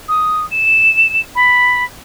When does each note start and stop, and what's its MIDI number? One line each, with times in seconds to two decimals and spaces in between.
0.08 0.45 87
0.51 1.20 100
1.35 1.84 83